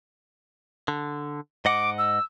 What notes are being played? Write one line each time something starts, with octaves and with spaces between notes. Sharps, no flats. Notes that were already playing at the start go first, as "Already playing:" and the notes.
D3
G#2 D#5 F#5 D6
E6